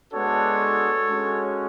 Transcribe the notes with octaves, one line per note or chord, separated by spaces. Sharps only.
G#3 B3 D4 F#4 A4 C#5
G#3 C#4 F#4